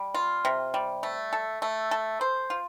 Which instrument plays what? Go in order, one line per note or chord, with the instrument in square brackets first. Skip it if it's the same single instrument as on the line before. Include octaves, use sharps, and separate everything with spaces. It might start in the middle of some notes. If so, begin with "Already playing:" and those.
Already playing: [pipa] G3
F4
C3
G3
A3
A4
A3
A4
C5
F4